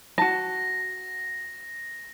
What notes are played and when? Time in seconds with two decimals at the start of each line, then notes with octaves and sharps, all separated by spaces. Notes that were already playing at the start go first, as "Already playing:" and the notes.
0.18 F#4 A5 A#6